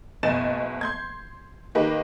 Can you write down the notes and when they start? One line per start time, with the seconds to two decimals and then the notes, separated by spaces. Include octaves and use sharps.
0.23 F#1 B2 D#5 G#5 A6 E7
0.81 C6 G6 G#6
1.75 D#3 A#3 D#4 G4 B4